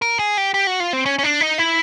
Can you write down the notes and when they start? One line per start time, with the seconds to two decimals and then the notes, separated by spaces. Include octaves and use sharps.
0.02 A#4
0.19 G#4
0.37 G4
0.54 G4
0.67 F#4
0.80 F4
0.93 C4
1.06 C#4
1.19 C#4
1.23 D4
1.41 D#4
1.58 E4